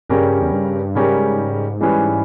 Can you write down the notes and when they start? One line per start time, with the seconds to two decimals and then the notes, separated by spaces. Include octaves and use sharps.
0.09 G2 C#3 G3 C#4 G4 A#4
0.42 E2
0.53 G2
0.95 G#2 C#3 G3 C#4 G4 A#4
1.81 E3 G3 C#4 G#4 B4